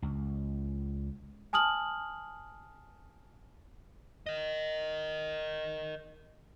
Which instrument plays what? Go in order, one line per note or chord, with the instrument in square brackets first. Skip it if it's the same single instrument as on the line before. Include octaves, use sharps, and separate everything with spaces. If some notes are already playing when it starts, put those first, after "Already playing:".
[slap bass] C#2
[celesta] G#5 A5 D#6 F6 F#7
[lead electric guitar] A#4 D#5